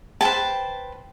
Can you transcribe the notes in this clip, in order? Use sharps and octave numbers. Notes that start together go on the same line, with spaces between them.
B4 C5 G5 A5